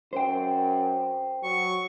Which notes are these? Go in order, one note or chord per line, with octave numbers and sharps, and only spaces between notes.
F#2 C5 G5
F#3 C#6